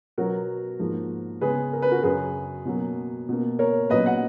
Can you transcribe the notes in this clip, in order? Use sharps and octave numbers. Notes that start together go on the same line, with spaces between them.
B2 F#3 B3 F#4 A#4
G#2 F3 A#3
C#3 G#3 B3 G#4 B4
A#4
B4
F#4 A#4
F#2 C#3 F#3 G#4 B4
B2 F#3 A#3
B2 A#3
A#4 C#5
A#2 F#3 B3 B4 D#5
D#5 F#5